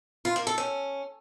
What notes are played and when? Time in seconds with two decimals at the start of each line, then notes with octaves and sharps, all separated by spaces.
0.25 F4
0.36 A#3
0.47 A4
0.58 C#4